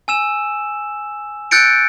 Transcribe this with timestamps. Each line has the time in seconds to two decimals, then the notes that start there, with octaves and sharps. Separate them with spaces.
0.08 G#5 E6 E7
1.51 E6 F#6 G6 A6 C#7 D7